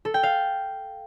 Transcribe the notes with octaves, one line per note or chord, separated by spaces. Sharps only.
A4
G5
F5